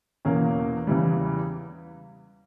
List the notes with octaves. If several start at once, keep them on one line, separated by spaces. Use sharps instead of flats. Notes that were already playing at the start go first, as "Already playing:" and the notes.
E2 B2 A#3 C#4
E2 C#3 E3 G3